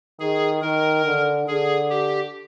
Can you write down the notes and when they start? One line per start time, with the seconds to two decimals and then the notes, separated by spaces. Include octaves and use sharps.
0.19 D#3 G#4
0.62 D#3 A#4
1.05 D3
1.48 D3 G#4
1.90 G4